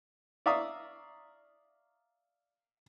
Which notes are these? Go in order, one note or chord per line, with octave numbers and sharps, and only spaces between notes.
D5 E5 F5 A#5 C#6 D#6